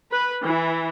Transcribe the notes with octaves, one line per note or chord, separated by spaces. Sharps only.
B4
E3